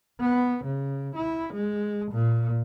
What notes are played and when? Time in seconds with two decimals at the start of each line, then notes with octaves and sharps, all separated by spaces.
0.20 B3
0.65 C#3
1.16 E4
1.53 G#3
2.12 A#2